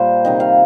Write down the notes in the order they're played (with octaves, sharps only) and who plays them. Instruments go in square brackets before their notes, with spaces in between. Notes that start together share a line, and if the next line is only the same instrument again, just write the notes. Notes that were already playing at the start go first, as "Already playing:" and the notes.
Already playing: [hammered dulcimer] A#2 G3 A#3 C5
C3 D#3 C4 D#5
F5